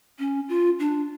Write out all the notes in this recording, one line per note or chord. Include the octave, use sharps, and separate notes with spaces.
C#4
F4
D4